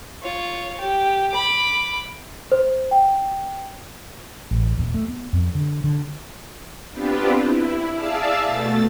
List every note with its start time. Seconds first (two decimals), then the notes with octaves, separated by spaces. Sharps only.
0.22 F4 C#5
0.80 G4
1.31 B5 D6
2.52 C5
2.91 G5
4.51 A1
4.77 D#1
4.94 A3
5.08 B3
5.33 F2
5.55 D3
5.84 D3
6.92 B3 C4 D4 F4 G4 B4
7.42 E4
7.94 G#4 D5 E5 F5 A5 E6
8.44 B2 A3 A6